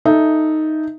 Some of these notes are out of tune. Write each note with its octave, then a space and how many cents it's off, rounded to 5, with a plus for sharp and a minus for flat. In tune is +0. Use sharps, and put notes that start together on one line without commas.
D#4 +0 A4 +0 E5 +0